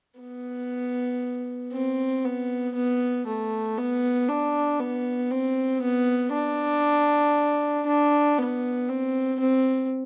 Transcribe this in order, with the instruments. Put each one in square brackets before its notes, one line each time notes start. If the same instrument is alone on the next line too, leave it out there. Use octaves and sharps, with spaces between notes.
[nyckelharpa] B3
C4
B3
B3
A3
B3
D4
B3
C4
B3
D4
D4
B3
C4
C4